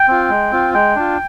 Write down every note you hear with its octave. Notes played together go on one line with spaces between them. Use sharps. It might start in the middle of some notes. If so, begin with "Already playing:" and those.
Already playing: G5
C4 F4
G#3
C4 F4
G#3 G5
D4 F4